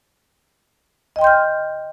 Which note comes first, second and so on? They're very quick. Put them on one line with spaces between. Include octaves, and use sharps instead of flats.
D#5 G5 C6 G6 F6